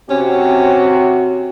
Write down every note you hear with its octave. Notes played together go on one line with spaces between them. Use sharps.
C3 C4 C#4 F#4